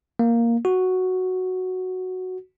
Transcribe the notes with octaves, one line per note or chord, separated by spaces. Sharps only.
A#3
F#4